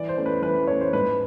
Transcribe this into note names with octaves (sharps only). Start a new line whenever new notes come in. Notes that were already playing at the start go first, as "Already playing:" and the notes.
Already playing: E3 D5
C5
A3 C#4
B4
E3 B4
A3 C#4 C#5
C5
G#2 B4